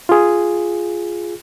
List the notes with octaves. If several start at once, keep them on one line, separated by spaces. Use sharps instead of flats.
F4 G#4